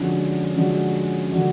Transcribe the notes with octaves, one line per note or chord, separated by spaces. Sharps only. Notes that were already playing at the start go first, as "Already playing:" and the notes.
Already playing: D3 F3 G#3 C#4 D4 F#4
D3 F3 G#3 C#4 D4 F#4
D3 F3 G#3 D4 F#4